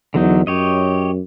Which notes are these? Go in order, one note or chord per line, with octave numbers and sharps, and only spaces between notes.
E2 D3 F#3 D#4
F#2 G4 C#5 D#5